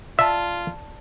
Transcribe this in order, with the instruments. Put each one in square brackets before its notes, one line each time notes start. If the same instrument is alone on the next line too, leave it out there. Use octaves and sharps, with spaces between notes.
[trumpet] F4 [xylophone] D5 A5 [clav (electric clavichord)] E5